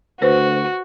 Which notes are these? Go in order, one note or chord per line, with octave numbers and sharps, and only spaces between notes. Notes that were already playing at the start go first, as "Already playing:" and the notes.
D2 F#4 B4 C5